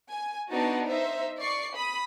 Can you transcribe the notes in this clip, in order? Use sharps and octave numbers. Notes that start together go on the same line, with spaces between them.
G#5
B3 D4 D#4 F#4 A5
D#4 C5 E5
D5 C#6 C7
B5 D#6